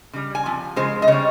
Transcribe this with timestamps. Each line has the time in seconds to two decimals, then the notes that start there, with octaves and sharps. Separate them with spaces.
0.13 C#3 G3
0.35 G#5
0.46 C3 F3
0.76 C#3 G#3 C5
1.02 D#5
1.08 C#3 G3 C#5